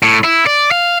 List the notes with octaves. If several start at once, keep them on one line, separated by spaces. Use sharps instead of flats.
A2
E4
D5
F5